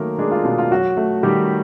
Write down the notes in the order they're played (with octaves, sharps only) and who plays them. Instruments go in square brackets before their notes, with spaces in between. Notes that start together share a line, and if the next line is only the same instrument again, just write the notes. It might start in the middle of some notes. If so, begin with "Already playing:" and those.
Already playing: [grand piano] D#3 F#3 A3 A#3 A#4
G#3 D4 G#4
F4
B2 F4
F4
F#3 F#4
A3
D#3 G3 G4